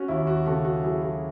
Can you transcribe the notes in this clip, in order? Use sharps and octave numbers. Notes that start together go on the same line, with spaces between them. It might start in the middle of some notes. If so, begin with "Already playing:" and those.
Already playing: C#4 F#4
D#2 E4
F#4
C#3 F#4 A4
F#4
F#3 E4 G#4
F#4 A4